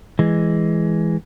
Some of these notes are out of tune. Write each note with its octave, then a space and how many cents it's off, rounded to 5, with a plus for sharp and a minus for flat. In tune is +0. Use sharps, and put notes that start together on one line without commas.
E3 +0 G#3 +0